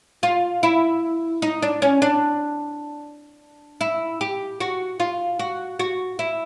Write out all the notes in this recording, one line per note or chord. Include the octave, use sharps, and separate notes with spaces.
F4
E4
D#4
D4
C#4
D4
E4
G4
F#4
F4
F#4
F#4
E4